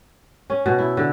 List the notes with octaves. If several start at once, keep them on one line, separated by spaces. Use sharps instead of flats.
C#4
B2
E4
D3